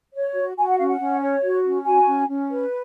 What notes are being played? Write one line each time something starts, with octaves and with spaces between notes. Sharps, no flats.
C#5
F#4
F#4 G#5
F#5
C#4 F5
F#5
C#4
C#5
F#4
C#4
F#4 G#5
C#4
C#4
B4